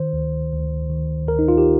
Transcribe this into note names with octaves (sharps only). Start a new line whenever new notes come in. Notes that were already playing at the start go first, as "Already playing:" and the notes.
Already playing: D#3 C5
D2
D2
D#3
D2 A#4
D#4
F4
G4